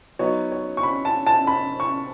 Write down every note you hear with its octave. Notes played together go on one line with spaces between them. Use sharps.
F#3 B3 D#4 C#5
C#5
C#6
B5
A5
A5
B5
C#6